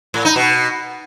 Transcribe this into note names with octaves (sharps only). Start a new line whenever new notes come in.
A2
D#4
B2